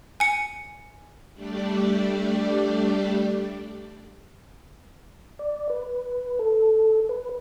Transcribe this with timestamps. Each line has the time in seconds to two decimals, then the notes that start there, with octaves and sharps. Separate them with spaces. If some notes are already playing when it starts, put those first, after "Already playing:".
0.20 G#5 C#7
1.34 G3 A3 D4 G4 D5
5.39 D5
5.70 B4
6.39 A4
7.09 B4